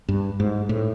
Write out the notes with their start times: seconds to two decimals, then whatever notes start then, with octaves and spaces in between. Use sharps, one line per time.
0.08 G2
0.40 G#2
0.69 A2